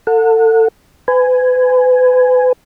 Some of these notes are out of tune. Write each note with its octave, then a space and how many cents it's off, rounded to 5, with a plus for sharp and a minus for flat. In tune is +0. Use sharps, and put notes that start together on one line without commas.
A4 +30 F#5 -30
B4 +35 G#5 +0